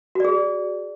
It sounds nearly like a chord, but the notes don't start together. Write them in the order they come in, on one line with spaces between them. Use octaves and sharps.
F#4 D5 G#4